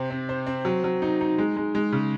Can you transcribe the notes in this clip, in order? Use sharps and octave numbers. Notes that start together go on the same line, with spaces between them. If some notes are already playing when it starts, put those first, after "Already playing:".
Already playing: C3 C4
C4
C5
C4
F#3
F#3
D#4
D#4
G#3
G#3
G#3
C#3